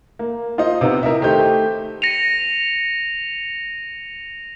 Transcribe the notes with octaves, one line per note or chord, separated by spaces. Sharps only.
A#3
D#4 F4 C5 D#5
C3 B3 D#4
E4 A#4 D#5 E5
D#3 A3 G4 C5 D#5 G6
A#6 C#7 D#7 F7